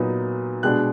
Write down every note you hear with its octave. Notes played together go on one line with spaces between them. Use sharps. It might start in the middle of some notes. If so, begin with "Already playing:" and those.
Already playing: A#2 F#3 B3 D#4
B2 G#3 D4 F#6